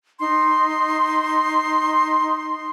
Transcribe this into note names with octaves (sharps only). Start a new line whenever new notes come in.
D#4 C6